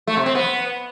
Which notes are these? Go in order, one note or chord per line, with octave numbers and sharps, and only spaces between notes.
A3
C3
C4
B3